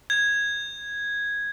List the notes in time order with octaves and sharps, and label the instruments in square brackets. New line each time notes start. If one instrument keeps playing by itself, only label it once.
[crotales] G#6